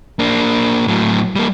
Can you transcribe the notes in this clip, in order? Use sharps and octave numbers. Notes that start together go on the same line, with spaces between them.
A#3 D4
A2 F#3
G3 A#3